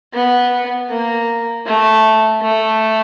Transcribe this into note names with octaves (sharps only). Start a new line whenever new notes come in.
B3
A#3
A3
A3